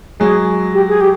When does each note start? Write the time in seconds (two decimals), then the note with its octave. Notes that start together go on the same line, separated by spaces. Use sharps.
0.20 F#3 G#3 G#4
0.73 G4
0.88 G#4
1.01 G4